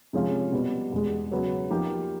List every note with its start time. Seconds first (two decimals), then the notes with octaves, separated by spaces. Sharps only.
0.13 C3 F3 G#3 C#4 F4
0.52 B2 G3 B3
0.92 E2 B2 G#3
1.31 C#3 F#3 B3
1.70 F3 A#3 D#4 G4